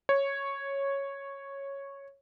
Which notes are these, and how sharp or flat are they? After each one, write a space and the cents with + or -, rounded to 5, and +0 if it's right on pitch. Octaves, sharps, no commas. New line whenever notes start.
C#5 -5